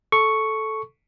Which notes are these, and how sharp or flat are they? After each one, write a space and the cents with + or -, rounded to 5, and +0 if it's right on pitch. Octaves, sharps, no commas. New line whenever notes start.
A4 -10 C#6 +0